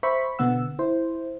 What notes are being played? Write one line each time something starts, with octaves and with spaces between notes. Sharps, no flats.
C5 E5 B5 C#6 B6
B2 D3 B3 F#5 E6
E4 C5